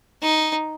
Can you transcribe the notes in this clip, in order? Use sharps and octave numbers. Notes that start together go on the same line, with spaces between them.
D#4